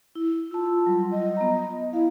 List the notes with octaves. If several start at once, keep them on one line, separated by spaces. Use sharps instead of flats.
E4
F4 A5 E6
F#3 G3
D#5
B3 A#5
E4 F5